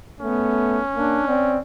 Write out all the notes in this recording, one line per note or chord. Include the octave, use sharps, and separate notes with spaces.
A3 B3 C#4
A#3 D4
C4 D5